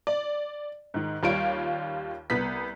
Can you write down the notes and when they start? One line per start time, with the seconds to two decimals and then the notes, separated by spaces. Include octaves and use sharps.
0.07 D5
0.94 G#2 D#3
1.23 D#2 G3 F4 C#5 D7
2.30 C2 B3 B6